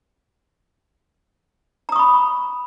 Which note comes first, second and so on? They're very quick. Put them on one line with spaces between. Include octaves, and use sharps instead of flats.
A#5 D#6 C#6 B5